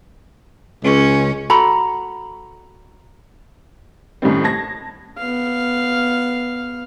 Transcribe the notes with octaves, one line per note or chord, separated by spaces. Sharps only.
C#2 C#4
F#4 A4 A#5 B5
F#2 A2 D#3 G3 C4
A5 G#6 A#6
B3 F5